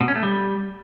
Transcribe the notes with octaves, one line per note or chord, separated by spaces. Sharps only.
B2
C#4
A3
G3